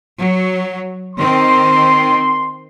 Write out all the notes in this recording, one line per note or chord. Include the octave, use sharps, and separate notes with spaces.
F#3
D#3 C4 C6